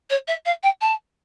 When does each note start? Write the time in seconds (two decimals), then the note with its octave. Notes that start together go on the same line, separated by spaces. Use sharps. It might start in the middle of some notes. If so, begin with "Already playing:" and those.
0.10 C#5
0.28 E5
0.45 F5
0.63 G5
0.81 A5